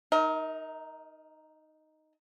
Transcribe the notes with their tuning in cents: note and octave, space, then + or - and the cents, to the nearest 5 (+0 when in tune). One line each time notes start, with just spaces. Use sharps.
D#4 +0 A#4 +0 D#5 +45